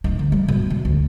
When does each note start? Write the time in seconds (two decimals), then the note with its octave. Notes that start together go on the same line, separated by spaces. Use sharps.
0.04 D1 D#4
0.19 D3
0.32 G3
0.48 B2
0.70 F3
0.85 D2